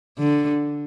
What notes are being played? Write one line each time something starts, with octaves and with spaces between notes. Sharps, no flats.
D3